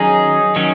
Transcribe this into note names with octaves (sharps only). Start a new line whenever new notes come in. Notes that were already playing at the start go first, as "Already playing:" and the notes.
Already playing: D#3 F#3 C#4 D#4 G#4
D#3 F#3 C#4